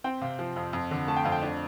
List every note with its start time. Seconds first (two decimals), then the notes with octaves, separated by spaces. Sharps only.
0.04 C4 G5
0.21 C3 F5
0.39 F3
0.56 F2
0.73 F2
0.91 D3
1.07 A3 A5
1.16 G5
1.24 F2 F5
1.32 G5
1.43 D4